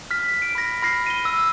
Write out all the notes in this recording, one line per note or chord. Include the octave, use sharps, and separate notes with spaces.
F6 B6
D7
B5 A#6
B5 F6 A#6 C7
D#7 G7
E6